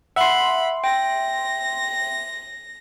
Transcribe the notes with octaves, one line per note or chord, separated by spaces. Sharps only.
E5 F#5 B5 C6
G5 A#6